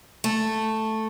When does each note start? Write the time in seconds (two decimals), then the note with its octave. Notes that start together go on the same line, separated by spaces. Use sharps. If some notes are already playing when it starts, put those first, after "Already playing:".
0.24 A3